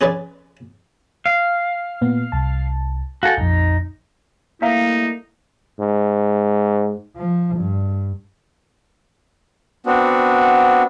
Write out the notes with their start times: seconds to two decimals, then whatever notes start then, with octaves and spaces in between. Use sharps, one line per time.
0.01 C#4 G#4 B4 C#5 D5
1.26 F5
2.01 A#2 B3
2.32 C2 A5
3.23 F#4 A4 F5 G#5 G6
3.37 A#1 F2 D#4
4.62 G3 A3 A#3 D#4 E4 E5 F5 A#5
5.80 G#2
7.16 F3
7.57 G2
9.86 B3 C4 D4 F#4